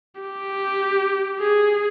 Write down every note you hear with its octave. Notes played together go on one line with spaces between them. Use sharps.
G4
G#4